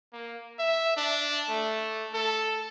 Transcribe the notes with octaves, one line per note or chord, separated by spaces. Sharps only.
A#3
E5
D4
A3
A4